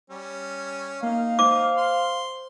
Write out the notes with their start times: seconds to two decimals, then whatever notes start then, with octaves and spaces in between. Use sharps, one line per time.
0.10 G3 C#4
1.03 A#3 D#4 F5
1.39 C5 D6
1.77 C6